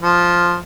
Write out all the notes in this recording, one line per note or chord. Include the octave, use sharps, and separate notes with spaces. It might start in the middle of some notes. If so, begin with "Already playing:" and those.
F3